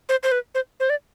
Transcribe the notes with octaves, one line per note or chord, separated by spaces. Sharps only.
C5
C5
B4
C5
C5
D5